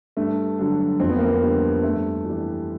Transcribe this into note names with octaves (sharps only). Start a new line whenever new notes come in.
G2 A3
D3 F#3
F2 C4
B3
A#3
B3
D3 G3
G2 A3
E3 G3